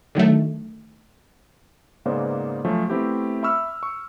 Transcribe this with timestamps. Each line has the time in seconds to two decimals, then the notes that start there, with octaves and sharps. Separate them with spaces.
0.15 D3 D#3 F#3 A3
2.05 G#2 C#3 A#3 B3 C5 D5
2.65 F3 F#3 A3 C#4
2.90 A3 B3 C4 E4 G4
3.43 E5 B5 C#6 E6 F6
3.83 C#6